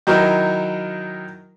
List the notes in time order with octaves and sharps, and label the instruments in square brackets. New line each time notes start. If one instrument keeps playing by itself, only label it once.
[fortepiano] D#3 F#3 D#4 E4 A#4